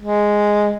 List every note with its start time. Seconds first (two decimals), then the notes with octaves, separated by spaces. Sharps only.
0.02 G#3